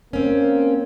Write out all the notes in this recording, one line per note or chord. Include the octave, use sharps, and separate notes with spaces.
A#3 C4 C#4